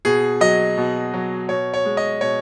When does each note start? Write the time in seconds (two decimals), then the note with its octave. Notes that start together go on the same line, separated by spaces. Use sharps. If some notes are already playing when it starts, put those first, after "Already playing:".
0.05 B2 G#4
0.41 F#3 D#5
0.78 B2
1.14 F#3
1.49 B2 C#5
1.74 C#5
1.85 G#3
1.97 D#5
2.21 B2 C#5